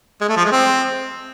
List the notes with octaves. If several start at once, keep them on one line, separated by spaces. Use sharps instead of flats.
G#3
A3
F3
G#3
C4